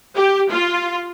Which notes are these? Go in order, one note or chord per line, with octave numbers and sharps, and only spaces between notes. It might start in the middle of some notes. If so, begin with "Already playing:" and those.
G4
F4